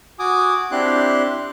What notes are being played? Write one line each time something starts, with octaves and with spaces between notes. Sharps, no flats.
F#4 G#5 D6 D#6
C4 D4 E4 G4 C6 F#6